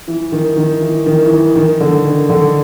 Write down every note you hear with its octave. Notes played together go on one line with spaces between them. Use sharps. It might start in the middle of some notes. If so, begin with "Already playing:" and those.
E3
D#3
D#3
E3
D#3
E3
D#3
D#3
D3
D#3
D3